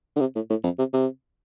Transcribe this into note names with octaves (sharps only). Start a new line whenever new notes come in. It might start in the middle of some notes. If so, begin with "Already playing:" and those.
D3
C3
A2
A2
F2
C3
C3